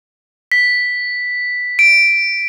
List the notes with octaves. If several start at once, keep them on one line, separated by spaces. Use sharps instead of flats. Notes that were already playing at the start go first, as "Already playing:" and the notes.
B6
D7